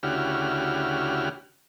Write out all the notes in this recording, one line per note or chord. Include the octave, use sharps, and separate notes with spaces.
D2 C#3 E4 F#4 G4 F6